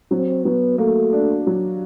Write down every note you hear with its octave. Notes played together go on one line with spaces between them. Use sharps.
F#3 C4
F#3 B3
A3 A#3
D4
F#3